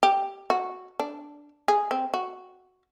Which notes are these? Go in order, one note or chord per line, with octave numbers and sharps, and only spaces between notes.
G4
F#4
D4
G#4
C4
F#4